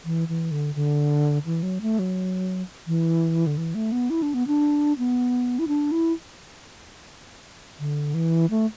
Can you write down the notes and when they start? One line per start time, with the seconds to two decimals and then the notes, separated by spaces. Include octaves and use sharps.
0.05 E3
0.28 E3
0.51 D3
0.75 D3
1.46 E3
1.63 F#3
1.82 A3
1.99 F#3
2.87 E3
3.47 D3
3.58 E3
3.75 A3
3.92 B3
4.10 E4
4.22 D4
4.34 B3
4.47 D4
4.98 B3
5.59 E4
5.68 D4
5.92 E4
7.80 D3
8.14 E3
8.50 A3